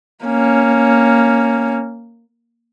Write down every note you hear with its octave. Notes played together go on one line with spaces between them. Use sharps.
A#3 C#4